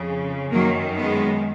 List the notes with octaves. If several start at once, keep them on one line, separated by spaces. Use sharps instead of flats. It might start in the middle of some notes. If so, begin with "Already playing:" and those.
Already playing: F2 C#3
F#2 D#3 F#3 A#3
G#3 B3